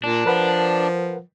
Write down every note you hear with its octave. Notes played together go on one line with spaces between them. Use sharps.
A#2 D4
F3 A#4 B4 F#5